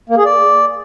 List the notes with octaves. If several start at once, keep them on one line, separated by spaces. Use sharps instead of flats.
A#3
G#4
D5